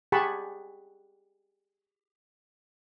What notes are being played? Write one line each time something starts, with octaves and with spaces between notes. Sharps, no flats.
G4 G#4 F#5 A5 B5 C#6